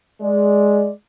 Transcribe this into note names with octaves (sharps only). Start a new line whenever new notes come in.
G#3 D5